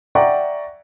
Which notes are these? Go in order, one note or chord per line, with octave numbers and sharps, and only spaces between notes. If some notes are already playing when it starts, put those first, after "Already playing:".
D5 E5 F#5 G5 A#5 C#6